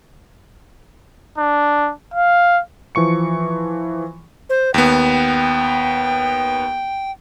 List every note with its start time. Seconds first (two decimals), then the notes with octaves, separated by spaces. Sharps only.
1.38 D4
2.14 F5
2.95 E3 F3 C#6 C#7
4.50 C5
4.74 D#2 B3 G5